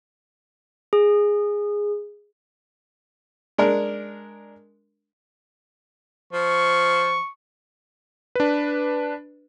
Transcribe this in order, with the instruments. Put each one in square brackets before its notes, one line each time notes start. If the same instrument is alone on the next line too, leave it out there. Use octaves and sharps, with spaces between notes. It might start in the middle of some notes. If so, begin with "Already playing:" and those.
[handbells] G#4
[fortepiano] G#3 D4 A#4
[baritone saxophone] F3 [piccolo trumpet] C#6
[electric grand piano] D4 B4